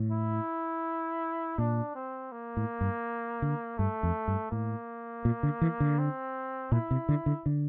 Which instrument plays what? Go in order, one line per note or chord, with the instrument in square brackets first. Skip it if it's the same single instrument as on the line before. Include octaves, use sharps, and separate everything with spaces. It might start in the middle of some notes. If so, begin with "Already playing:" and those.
Already playing: [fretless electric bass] A2
[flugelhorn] E4
[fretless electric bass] A#2 [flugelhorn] D4
[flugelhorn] C4
A#3
[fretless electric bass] A2
G2
D3
[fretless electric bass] G2 [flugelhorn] A3
[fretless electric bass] F2
G2
[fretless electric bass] A2 [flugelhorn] A#3
[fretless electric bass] A#2
D3
E3
D3
[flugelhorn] C4
[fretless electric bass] A#2 [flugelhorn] E4
[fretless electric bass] C3
D3
D3
D3